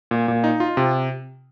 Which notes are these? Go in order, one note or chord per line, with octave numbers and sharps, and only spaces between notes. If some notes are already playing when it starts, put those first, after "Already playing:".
A#2
A#2
D#4
F4
C3